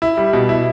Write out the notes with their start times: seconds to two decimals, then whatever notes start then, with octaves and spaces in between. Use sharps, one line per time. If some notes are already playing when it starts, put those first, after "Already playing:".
0.02 E4
0.17 G3
0.33 B2
0.49 E4